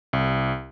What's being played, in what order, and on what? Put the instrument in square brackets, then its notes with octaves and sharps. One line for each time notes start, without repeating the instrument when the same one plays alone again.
[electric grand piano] C2